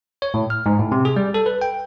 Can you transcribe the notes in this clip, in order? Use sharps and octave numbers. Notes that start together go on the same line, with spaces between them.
C#5
A2
F6
G#2
A2
C3
G#4
G3
A4
B4
G5